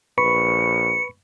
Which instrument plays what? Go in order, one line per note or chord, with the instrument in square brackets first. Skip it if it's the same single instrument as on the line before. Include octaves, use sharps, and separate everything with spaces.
[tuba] A#1 [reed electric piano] B4 B5 C#6 [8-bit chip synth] C#7